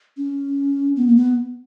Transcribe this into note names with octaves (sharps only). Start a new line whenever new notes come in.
C#4
B3
A#3
B3